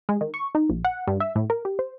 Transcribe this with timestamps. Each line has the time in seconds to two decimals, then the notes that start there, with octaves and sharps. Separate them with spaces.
0.09 G#3
0.21 D#3
0.34 C#6
0.55 D#4
0.69 A#1
0.85 F#5
1.07 G2
1.20 E5
1.36 A2
1.50 A#4
1.65 G4
1.79 C5